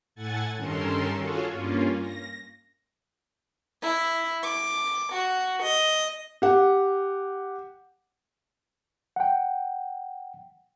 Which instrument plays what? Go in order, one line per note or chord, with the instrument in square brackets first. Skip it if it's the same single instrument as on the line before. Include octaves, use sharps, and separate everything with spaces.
[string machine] A2 A3 F#5 G#5 G#6 A6
G2 D#3 C#4 A4 A#4 C6
F4 F#4 G#4 A4 C#5 F5
G2 A#3 C#4 F4
A#6
[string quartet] E4
D6
F#4
D#5
[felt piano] G4 F#5
[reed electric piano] F#5 G5